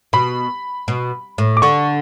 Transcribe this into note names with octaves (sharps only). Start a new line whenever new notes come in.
B2 B5
B2
A2
D6
D3 C#6